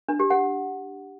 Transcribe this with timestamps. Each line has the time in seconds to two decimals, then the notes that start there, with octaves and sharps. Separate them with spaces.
0.09 D4
0.19 G4
0.30 F#5